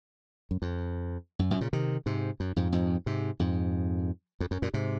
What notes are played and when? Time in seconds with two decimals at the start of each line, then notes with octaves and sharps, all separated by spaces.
0.51 F#2
0.62 F2
1.39 F#2
1.51 F#2 A#2
1.61 A#2 C#3
1.73 C3 D#3
2.06 G#2 C3
2.40 F#2
2.56 F2 G#2
2.72 F2 G#2
3.06 G#2 C3
3.39 F2 G#2
4.40 F2
4.51 F#2
4.62 F#2 A#2
4.74 G#2 C3